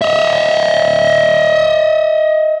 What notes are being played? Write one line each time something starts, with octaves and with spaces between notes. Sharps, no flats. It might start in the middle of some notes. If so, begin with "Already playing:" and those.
D#5 E5